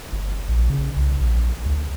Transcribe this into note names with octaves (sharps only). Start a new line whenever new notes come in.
G1
A#1
C#3
C2
A#1
D2